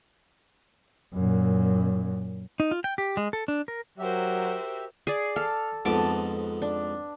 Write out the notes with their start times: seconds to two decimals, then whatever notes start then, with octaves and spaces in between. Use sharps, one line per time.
1.14 F#2 A#2
2.60 D#4
2.71 F4
2.84 G5
2.98 G4
3.17 G#3
3.33 A4
3.48 D4
3.68 A#4
3.98 F#3 F#4 G4 A#4 C5 E5
5.07 G#4 D5
5.36 A4 F5
5.85 F2 G#2 B3 A5 D6
6.62 D4